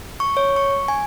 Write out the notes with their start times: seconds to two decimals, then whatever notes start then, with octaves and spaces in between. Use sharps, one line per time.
0.20 C#6
0.37 C#5
0.56 C#6
0.88 G#5